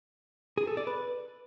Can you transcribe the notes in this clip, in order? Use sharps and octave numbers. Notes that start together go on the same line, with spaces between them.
G#4
A4
D5
B4